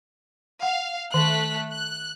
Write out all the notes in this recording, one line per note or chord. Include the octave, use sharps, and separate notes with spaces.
F5 F#5
D#3 A3 F#6 B6
F#6